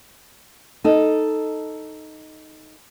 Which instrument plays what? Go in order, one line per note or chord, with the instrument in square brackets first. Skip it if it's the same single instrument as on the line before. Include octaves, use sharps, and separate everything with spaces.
[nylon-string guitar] D#4 A4